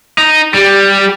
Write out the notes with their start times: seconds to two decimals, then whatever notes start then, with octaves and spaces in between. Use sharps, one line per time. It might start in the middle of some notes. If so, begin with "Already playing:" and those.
0.18 D#4
0.54 G3 G4